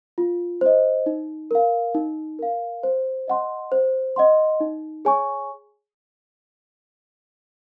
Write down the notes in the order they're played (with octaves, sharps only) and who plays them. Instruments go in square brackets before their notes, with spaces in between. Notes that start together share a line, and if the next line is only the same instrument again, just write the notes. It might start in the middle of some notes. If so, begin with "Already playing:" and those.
[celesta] F4
C5 D#5
D#4
A#4 F5
D#4
A#4 F5
C5
D#5 F#5 C6
C5
D#5 F#5 C6
D#4
G#4 C#5 G#5 C#6